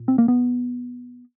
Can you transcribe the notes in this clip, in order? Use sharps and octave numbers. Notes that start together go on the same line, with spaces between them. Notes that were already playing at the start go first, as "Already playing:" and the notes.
Already playing: A#2
C4
A#3
B3